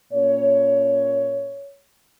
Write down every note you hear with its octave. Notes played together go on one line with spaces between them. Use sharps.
A#2 A#3 C#4 C#5